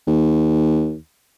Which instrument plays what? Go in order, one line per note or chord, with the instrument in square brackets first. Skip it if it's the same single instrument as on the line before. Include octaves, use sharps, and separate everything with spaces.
[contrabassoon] D#2